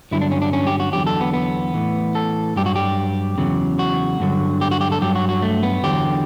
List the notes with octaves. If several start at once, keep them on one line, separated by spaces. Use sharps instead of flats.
G2 D3 F#3 E4
D4
C#4
D4
C#4
G4
F#4
E2 D3 F#3 G4
A4
B3
B3
A2 E3
A4
G2 F#3 G4
F#4
G4
E2 C#3 F#3
F#4
G2 D3 F#3
G4
F#4
G4
A4
G2 F#3 G4
F#4
F#4
A3
B3
E2 D3 F#3 G4